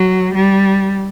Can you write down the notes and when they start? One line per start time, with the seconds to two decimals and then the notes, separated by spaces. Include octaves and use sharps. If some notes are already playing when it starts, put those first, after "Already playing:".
Already playing: F#3
0.34 G3